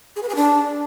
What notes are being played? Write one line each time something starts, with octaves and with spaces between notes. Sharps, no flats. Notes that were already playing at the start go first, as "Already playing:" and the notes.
G#4
B4
G#4
D4